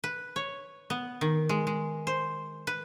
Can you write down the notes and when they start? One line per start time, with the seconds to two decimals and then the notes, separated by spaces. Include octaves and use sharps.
0.04 B4
0.36 C#5
0.90 B3
1.21 D#3
1.49 G#3
1.67 G#3
2.07 C5
2.67 B4